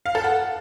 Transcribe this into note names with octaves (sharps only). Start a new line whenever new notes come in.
F5
A4
F#5